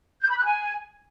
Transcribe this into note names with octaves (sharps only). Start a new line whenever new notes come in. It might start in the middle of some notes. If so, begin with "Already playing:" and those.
G6
B5
F#6
G#5